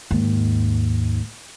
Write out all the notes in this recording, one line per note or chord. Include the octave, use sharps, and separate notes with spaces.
D#2 G#2